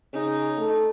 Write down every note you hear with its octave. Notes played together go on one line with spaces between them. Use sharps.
C#3 D#4
A3